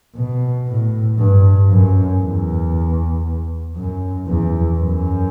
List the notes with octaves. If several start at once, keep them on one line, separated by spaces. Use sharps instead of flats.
B2
A2
G2
F#2
E2
F#2
E2
F#2